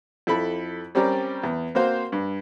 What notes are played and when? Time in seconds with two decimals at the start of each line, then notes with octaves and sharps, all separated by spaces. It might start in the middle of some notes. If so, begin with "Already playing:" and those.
0.27 F2 E4 A4 B5
0.95 G3 C4 C#4 G4 A#4 D5
1.44 E2
1.75 A#3 C4 F#4 C5 F5
2.12 G2